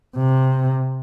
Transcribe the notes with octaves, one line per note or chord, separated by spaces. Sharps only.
C3